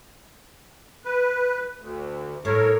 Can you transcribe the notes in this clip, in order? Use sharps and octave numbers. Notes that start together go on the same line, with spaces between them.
B4
D2
A2 A#4 C#5